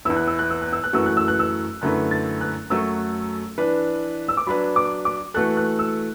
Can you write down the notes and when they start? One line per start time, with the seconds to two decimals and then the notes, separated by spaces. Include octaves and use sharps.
0.05 E2 E3 B3 E4 E6
0.16 F#6
0.27 E6
0.39 F#6
0.50 E6
0.61 F#6
0.73 E6
0.84 F#6
0.93 F#2 E3 A3 F#4 E6
1.06 F#6
1.17 E6
1.28 F#6
1.39 E6
1.81 F#2 D3 A3 E4 B4 F#6
2.11 A6
2.41 F#6
2.70 F#2 F#3 A3 F#4 A4 E6
3.58 E3 D4 B4
4.28 E6
4.37 D6
4.47 F#3 D4 B4 B5
4.76 D6
5.05 D6
5.34 E3 A3 F#4 A4 F#6
5.57 F#6
5.79 E6